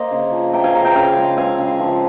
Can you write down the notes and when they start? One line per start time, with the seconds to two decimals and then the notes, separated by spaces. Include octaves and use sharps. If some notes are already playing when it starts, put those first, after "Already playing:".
Already playing: A#3 A#4 C5 D#5
0.11 C#3
0.31 F3
0.53 A#3 G5 A#5
0.64 F5 G#5
0.74 C#3 G5 A#5
0.85 G5 A#5
0.95 C#3 F5 G#5
1.16 G#3
1.37 C4 F5 G#5
1.58 C#3
1.80 F3